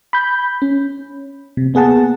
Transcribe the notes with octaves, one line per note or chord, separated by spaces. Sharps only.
B5 G6
C#4
C3
A#3 B3 G#4 F#5 A5